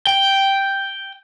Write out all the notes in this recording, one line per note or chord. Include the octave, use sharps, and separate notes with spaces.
G5